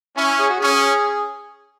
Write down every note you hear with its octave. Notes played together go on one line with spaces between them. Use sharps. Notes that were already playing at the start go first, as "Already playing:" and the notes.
C#4 E4
G#4
F#4
C#4 G#4